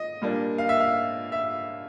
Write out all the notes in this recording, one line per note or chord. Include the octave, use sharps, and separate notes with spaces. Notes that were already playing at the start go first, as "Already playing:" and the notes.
Already playing: D#5
A#2 G3 A#3 D4
F5
E5
F5
E5